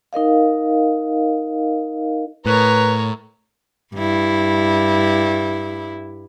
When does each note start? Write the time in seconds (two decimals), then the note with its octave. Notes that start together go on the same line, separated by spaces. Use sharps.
0.13 D#4 A#4 D#5 F5
2.46 A2 A#4 B4 C#5
3.95 G2 E4